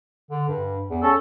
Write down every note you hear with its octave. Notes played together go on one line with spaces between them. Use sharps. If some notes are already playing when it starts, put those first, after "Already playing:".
D3
G2
E2
C#4 A4